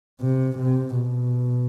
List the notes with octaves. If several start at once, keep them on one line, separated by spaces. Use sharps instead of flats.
C3
C3
B2